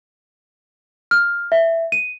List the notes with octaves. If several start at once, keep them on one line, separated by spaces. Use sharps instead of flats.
F6
E5
D#7